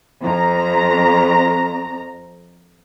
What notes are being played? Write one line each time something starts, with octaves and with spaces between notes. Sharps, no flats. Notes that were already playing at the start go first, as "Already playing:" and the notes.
F2 A#5